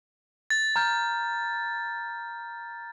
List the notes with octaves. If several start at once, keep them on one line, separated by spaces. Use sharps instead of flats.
A6
A#5 F6 G6